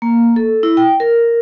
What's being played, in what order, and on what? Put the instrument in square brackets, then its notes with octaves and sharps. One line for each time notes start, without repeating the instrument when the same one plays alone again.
[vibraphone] A#3
A4
E4
G5
A#4